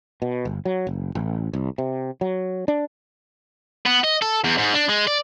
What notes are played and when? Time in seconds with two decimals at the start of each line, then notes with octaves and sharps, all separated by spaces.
0.22 B2
0.45 G1
0.65 F#3
0.87 F#1
1.15 A1
1.53 C2
1.78 C3
2.21 F#3
2.68 D4
3.86 B3
4.04 D#5
4.22 A4
4.45 E2
4.58 G#2
4.75 D4
4.89 G#3
5.07 D5